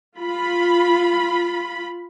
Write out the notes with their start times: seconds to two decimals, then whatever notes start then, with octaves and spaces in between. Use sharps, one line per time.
0.17 F4 B5